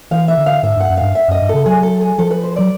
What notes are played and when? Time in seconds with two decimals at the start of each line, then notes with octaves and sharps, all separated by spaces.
0.11 E3 F5
0.28 E5
0.37 D3
0.46 F5
0.63 G#2 E5
0.76 G2 F#5
0.89 F#2
0.97 G2 F5
1.15 E5
1.28 F#2 D#5
1.41 G2
1.49 C#3 A4
1.66 F#3 G#4
1.83 A4
2.01 G#4
2.18 F3 A4
2.31 B4
2.43 C5
2.56 F#3 D5